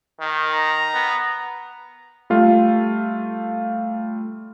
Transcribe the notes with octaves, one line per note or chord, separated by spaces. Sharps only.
D#3
A#5
B3
G3 A3 F4